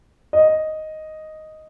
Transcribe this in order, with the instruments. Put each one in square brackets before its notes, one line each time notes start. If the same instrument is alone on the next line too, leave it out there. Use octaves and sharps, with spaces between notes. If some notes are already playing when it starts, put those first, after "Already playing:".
[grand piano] D#5